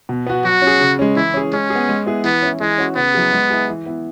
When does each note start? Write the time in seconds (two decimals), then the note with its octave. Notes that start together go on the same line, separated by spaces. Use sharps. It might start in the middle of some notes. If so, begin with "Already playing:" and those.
0.09 B2
0.26 B3 F#4
0.44 F#3 F#4
0.62 C#4
0.67 G#4
0.81 C#3
0.99 G#3 C#4
1.16 E3 E4
1.34 C#4 G#4
1.53 G#3 C#4
1.70 G#4
1.75 B3
1.89 G#3
2.06 B3 E4 G#4
2.24 E3 B3
2.42 C#4 E4
2.61 E3 G#3
2.78 C#4 F#4
2.96 C#3 B3
3.14 F#3 E4 G#4
3.33 G#3
3.50 E4 G#4
3.69 E3
3.86 B3 E4